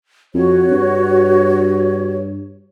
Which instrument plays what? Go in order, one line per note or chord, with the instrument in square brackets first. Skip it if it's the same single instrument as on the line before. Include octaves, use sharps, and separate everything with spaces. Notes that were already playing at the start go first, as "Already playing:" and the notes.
[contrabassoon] F2 [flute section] F#4 C#5
[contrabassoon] G2